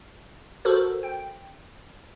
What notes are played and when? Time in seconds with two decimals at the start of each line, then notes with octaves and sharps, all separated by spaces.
0.65 F#4 A4 A#4 C5
1.03 G5